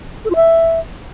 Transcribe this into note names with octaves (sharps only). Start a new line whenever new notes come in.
A4
F4
E5